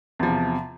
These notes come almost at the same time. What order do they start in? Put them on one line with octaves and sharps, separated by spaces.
E2 F3 C3